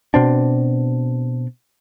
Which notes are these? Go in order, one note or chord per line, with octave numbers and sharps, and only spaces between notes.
B2 C4 D4